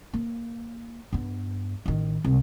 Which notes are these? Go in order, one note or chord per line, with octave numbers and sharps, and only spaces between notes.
A#3
G2 B3
A1 D#3
C2